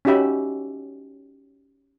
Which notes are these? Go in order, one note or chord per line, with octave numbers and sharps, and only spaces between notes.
C#4 D#4 F#4 G4 E5 B5